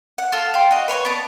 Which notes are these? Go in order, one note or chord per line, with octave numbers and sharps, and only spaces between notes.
F#5
F4 A4
F5 G5 C6
F#4 D#5
B4 C#5 C6 C#6
B3 D5 A5